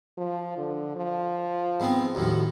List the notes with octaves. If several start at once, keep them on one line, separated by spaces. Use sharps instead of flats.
F3
D3
F3
G#2 B3 C4
D#2 A2 F3 F#4